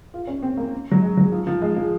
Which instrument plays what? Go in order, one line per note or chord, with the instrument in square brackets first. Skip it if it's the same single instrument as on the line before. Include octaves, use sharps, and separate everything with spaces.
[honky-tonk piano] F4
C#4
C4
A#3
F#3
G#3
F#3
F3
F3
G#3
F3